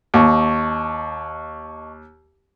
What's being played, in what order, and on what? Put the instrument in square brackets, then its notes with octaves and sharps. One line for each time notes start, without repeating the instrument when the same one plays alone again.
[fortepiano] D#2 [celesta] D#5 A5 C#6